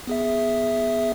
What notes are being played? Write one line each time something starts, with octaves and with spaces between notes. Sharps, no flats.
B3 G#4 E5